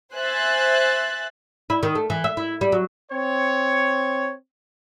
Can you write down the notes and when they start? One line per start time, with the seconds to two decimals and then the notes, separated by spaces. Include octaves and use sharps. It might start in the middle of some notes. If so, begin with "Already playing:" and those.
0.15 C5 E5 G#5 F#6 A6
1.70 E4
1.83 D#3
1.95 A3
2.10 E3
2.24 E5
2.37 E4
2.61 G3
2.72 F#3
3.11 C4 C#5